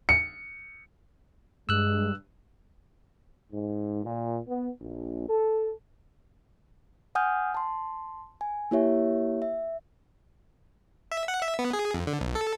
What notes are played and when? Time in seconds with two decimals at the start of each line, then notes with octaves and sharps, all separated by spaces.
0.09 C#7
1.69 G2 G#3 E6 F#6
3.52 G#2
4.04 A#2
4.48 B3
4.81 A#1
5.29 A4
7.15 F#5 G#5 D#6 F6 G6
7.55 A5 C6
8.41 G#5
8.71 A#3 E4 G4 C#5 E5
9.42 E5
11.12 E5
11.28 F#5
11.42 E5
11.59 B3
11.73 G#4
11.94 F2
12.07 D3
12.21 B1
12.35 A4